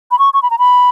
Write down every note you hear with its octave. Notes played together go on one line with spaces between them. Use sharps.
B5
C#6
C#6
B5
A#5
B5